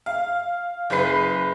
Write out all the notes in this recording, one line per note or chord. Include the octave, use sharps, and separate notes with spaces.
F5
F#1 G#4 B4 C7